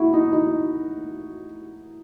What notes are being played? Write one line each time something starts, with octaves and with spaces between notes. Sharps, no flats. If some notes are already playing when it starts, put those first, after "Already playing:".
Already playing: E4 F#4
D#4
D#4